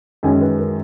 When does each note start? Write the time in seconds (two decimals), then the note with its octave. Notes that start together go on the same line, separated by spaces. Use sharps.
0.23 F#2 D#3 G#3 C#4 G#5
0.41 B4
0.59 A#4